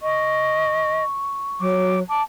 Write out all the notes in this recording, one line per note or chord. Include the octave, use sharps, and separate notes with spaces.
D#5 C#6
F#3 D6
A5 D6